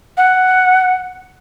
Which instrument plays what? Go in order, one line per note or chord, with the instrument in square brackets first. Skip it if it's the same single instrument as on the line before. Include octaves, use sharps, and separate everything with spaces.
[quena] F#5